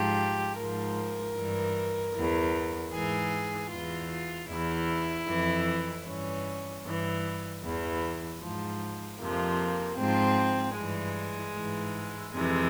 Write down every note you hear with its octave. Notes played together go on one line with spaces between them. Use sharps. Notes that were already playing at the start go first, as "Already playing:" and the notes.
Already playing: G#2 F3 G4
G#2 F3 A#4
G2 E3
E3
E2
G#2 E3 G#4
E2 E3 F4
F4
E2 E3 E4
F2 E3
G2 E3 C#4
G2 E3
E2 E3
G#2 F3
F2 C3 F3 A#3
G#2 F3 C4
G2 E3 G#3
G#2 E3
F2 C3 E3 G#3